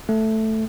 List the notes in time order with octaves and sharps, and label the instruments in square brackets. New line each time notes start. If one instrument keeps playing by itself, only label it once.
[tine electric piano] A3